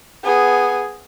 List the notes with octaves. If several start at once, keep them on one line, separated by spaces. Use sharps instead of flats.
B3 G#4